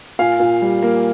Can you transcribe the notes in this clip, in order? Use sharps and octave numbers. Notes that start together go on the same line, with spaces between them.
A#2 F5 G#5
A#2
G3
A#3